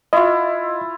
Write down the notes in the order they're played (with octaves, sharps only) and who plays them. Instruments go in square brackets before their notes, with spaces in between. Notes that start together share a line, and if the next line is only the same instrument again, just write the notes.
[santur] E4 F4 [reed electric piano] D#5